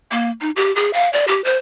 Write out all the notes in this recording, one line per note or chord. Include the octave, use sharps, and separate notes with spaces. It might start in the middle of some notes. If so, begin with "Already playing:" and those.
A#3
D#4
G4
G#4
F5
D5
G4
C5